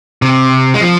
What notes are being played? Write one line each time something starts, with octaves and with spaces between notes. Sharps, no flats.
C3
G#3
F3